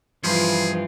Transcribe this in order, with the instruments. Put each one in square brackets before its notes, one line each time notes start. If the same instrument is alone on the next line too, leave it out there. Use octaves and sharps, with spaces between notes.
[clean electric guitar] G2 F3 [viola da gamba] E3 F4 [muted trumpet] G#4